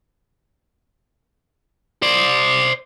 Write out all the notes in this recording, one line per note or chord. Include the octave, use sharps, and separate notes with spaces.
C5 D5